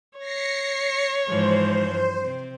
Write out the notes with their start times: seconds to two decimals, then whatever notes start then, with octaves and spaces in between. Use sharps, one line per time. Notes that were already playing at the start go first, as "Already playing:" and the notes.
0.18 C#5 A#6 C7 C#7
1.29 G#2 E3 F3 C5
1.91 G2
2.22 C3 C4